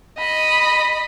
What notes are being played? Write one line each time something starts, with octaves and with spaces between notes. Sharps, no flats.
D#5 B5